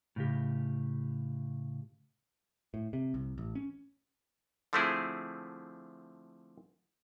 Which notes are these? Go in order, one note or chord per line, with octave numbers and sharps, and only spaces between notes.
A2 C#3 G4
A2
C3
C2
A1
C#4
D3 F3 A3 C4 E4 G#4